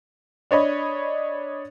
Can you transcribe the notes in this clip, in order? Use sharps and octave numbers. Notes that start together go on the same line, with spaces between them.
D4 C#5 D#5 B5